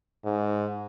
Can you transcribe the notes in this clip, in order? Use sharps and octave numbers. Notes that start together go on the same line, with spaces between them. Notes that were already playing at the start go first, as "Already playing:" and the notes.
G#2